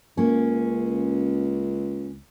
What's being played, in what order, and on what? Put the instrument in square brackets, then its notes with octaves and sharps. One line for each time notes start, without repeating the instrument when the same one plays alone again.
[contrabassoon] C#2 [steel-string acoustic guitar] A#3 C#4